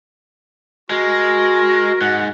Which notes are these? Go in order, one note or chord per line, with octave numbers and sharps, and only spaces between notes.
G#3 F#4 A#4
G#2 F#5